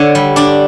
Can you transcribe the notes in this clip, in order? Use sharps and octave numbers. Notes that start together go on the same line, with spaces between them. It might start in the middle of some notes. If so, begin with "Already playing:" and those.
Already playing: D3 C#5 E5
G3
D4 D5